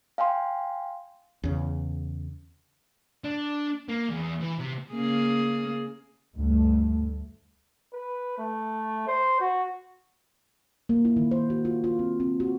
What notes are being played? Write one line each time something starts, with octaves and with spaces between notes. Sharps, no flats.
F5 G5 G#5 C6
E2 C#3
D4
A#3
E2
E3
C3
C#3 A#3 G#4
D2 G2 A3
B4
A3
C5
F#4
A#3
E4
D#3
C5
F#4
F4
F4
C4
C4
F#4